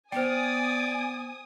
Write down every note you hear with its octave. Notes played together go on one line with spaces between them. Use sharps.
B3 C5 D5 G5 G#5 D#6